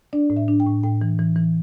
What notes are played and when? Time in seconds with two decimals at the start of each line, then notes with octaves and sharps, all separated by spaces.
0.13 D4 D5
0.30 A2
0.37 E5
0.48 D4
0.60 G5
0.66 A2
0.83 A2 G5
1.01 E3
1.19 E3
1.36 E3